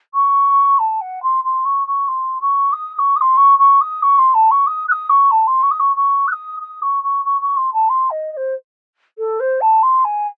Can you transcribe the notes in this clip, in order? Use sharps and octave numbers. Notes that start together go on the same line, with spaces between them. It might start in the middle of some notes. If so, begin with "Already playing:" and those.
C#6
A5
F#5
C6
C6
C#6
C#6
C6
C#6
D#6
D#6
C#6
D#6
C6
C#6
C#6
D#6
C#6
C6
A5
C#6
D#6
F#6
D#6
C#6
A5
C6
C#6
D#6
C#6
C#6
F#6
D#6
D#6
C#6
C#6
C#6
C#6
C6
A5
C6
D#5
D#5
C5
A4
C5
A5
C6
G#5